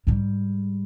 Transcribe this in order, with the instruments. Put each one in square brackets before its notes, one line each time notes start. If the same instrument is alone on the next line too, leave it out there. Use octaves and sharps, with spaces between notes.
[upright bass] G#2 G3